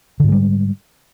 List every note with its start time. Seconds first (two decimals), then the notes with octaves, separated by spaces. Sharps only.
0.20 D3
0.24 G#2
0.28 G#3
0.32 G3